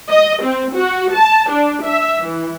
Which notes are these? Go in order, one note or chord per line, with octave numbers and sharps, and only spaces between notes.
D#5
C4
F#4
A5
D4
E5
E3